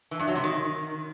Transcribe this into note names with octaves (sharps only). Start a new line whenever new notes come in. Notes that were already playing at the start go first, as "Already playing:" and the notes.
E3
G2
F#3
C3
D#3